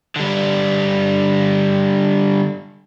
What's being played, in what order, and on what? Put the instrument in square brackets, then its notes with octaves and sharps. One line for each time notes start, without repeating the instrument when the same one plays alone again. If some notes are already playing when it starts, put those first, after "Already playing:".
[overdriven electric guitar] D3 G3